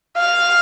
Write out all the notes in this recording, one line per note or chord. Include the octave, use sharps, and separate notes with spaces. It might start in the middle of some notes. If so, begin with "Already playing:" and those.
F5